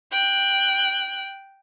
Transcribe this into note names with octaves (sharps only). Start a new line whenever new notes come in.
G5 F#6